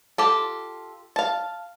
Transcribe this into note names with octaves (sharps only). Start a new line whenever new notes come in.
F4 G4 A4
F5 A5